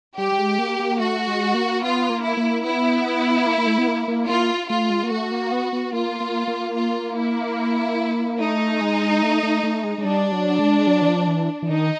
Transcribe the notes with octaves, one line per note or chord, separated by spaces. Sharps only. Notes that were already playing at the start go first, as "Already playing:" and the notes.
G3 G4
G3
G#3
A#3
A#3
A3 F#4
G#3
A#3
B3 F4
A#3
E4
A#3
B3 E4
A#3
A#3
A3
B3
A#3
A#3
A#3 F4
A3 F4
G#3
A#3
A3 F#4
A#3
B3
B3
A#3 F4
A#3
A#3
F4
E4
A3 D#4
G#3
A3
A3
A3
G#3
G#3
G3 D4
F#3
G#3
F#3
E3
F3
E3
E3
D#3 D#4